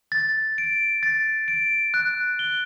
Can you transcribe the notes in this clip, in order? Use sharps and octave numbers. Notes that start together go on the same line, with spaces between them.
A6
D7
A6
D7
F#6
G7